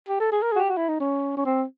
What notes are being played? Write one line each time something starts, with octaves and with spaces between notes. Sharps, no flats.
G4
A4
G#4
A#4
G#4
F#4
G4
F#4
E4
D#4
C#4
C#4
C4